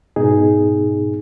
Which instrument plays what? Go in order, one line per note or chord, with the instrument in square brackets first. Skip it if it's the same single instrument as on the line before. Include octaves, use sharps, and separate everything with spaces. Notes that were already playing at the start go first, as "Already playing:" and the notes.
[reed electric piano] G#2 B2 D#4 G#4